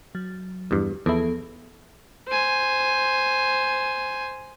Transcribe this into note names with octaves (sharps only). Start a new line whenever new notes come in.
F#3
E2 G2
E2 F3 B3 E4 A4
C5 G#5